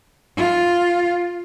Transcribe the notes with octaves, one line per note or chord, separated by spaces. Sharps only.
F4